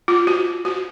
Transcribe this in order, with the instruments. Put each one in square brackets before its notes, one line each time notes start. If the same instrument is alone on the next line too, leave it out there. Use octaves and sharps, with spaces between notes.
[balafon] F4
F#4
F#4